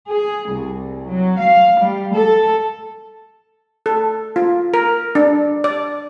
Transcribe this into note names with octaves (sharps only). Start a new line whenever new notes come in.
G#4
C2
F#3
F5
G3
A4
A4
F4
A#4
D4
D5